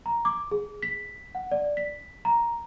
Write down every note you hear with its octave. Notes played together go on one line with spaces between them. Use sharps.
A#5
D6
G#4
B6
F#5
D5
B6
A#5